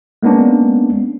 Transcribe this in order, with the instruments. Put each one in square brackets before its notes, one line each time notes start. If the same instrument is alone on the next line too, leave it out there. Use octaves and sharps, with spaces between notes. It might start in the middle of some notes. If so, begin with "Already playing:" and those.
[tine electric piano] G#3 A#3 B3 C#4 D4